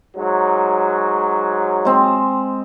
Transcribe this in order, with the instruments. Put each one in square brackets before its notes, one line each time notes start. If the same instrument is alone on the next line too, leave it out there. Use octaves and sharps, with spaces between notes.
[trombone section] G#2 F#3
[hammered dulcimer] G#3 C4